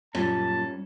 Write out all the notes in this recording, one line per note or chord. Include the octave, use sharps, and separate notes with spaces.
F#2 A#2 G3 C#4 A5